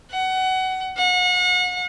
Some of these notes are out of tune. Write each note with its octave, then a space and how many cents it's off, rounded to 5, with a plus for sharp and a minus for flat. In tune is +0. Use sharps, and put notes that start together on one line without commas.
F#5 +25
F#5 -35